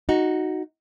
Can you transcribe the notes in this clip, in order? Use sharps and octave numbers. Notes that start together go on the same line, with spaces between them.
D#4 F#4